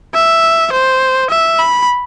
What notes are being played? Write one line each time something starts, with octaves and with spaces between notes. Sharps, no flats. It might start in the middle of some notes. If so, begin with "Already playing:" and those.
E5
C5
E5
B5